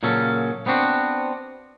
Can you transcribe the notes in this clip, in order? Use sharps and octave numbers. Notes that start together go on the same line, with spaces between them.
A#2 C#3 F#3 C#4 A4
B3 C4 D4 F#4